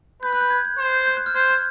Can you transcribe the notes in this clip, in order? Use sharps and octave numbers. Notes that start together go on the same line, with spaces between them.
B4 G6
F#6
G6
G#6
G#6
C5
G6
F#6
F6
C5 G#6
G6